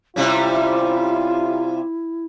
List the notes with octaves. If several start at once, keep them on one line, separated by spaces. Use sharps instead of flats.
C3 G3 C#4 E4 F4